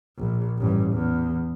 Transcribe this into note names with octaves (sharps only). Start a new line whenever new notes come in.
A#1
A1 G2
E2